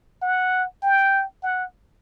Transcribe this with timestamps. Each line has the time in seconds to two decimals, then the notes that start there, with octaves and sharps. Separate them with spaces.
0.22 F#5
0.83 G5
1.43 F#5